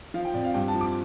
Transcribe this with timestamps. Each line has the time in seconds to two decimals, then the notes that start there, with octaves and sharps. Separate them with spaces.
0.14 F3 F5
0.25 G5
0.34 F2 D5
0.45 F5
0.54 G2 G5
0.68 A5
0.74 F3
0.81 D6